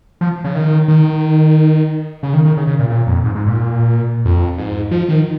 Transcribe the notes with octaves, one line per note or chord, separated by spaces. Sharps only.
F3
C#3
D#3
D#3
C#3
D#3
D#3
C#3
C#3
A#2
A#2
F2
G#2
G#2
A#2
F2
G#2
F3
D#3